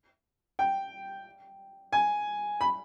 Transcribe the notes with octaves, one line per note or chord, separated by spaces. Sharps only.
G5
G#5
B5